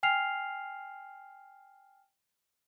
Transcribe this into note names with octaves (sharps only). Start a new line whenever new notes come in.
G5 G#5 F6 C7 F7